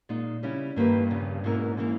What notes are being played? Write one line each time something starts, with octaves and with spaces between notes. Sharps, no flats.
A#2 G#3 D#4
C#3 G3 C#4 E4
G2 D#3 A#3 E4 G4 B4
E2 C#3 G3
G#2 B2 A#3 C#4 E4 A#4
E3 A#3 C#4 E4